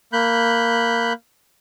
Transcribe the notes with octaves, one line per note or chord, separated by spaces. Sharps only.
A#3 B5 F#6 G6